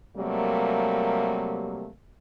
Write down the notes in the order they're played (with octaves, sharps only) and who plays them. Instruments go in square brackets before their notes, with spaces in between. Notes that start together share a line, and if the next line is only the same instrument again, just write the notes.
[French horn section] C3 F#3 G3 A3 A#3